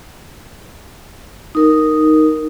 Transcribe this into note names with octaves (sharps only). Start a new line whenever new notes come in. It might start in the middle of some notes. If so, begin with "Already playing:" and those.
D#4 A#4